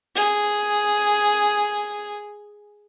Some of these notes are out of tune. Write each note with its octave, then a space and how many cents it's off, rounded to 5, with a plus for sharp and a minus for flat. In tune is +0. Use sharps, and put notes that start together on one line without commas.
G#4 +0